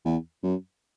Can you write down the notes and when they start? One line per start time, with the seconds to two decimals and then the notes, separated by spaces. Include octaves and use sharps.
0.05 E2
0.43 F#2